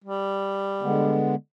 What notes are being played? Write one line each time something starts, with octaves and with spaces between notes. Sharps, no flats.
G3
D3 G#3 B3